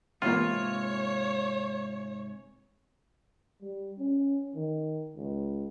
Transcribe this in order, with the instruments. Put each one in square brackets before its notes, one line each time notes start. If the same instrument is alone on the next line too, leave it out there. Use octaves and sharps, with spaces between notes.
[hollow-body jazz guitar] G#2 C3 F5 [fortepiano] E3 A#3 [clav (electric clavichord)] F4 [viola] C#5
[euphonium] G3
C#4
D#3
C#2